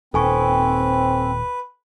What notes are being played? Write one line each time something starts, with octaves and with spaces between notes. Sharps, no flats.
D#1 C4 A4 B4 G#5 C#6